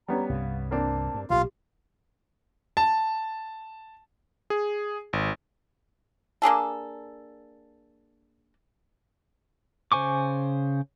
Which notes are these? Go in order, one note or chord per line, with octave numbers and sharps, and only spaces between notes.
G3 B3 C#4 A#5
C2 G2 C3 F5
A#3 C4 D4 A5
G2
B1 A#2 C#3 F4 G4 F5
A5
G#4
G#1
A#3 D4 G#4 A4
C#3 C5 G#5 C#6 D6